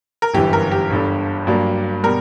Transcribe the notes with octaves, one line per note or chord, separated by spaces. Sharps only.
A#4
G1 F#2 E3 G4
A#4
G4
G1 G2 D3
G2 F#3 A#3 D4
B2 G3 A#4